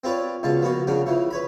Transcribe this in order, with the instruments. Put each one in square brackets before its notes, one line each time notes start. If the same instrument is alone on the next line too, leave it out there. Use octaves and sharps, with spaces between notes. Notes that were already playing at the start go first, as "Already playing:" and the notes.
[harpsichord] C4 F4 B4 C#5 D5
C#2 B2 F4 A5
F3 A#3 B3 F#4
C#3 F3 D4 F#4
C#3 E3 F3
B4 C#5 B5